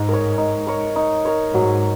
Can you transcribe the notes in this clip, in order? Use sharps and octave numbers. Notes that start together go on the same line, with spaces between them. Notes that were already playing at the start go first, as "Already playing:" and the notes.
Already playing: G#2 D#4
A#4 C#5
D#4
A#4 C#5
D#4
A#4 C#5
G#2 F#3